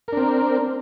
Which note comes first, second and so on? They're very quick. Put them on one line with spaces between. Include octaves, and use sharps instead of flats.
A#4 D4 C4